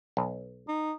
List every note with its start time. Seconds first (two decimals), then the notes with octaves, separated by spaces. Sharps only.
0.17 B1
0.68 D#4